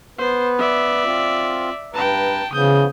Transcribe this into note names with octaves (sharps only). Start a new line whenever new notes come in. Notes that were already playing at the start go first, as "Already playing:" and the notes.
B3 B4 C5
D5 E5
C4 F4
G2 B4 G5 A5 A#5
C#3 E3 F3 B3 D#6 G6